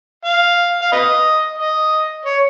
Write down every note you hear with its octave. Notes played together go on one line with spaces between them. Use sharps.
F5
F5
B4 D#5
D#5
C#5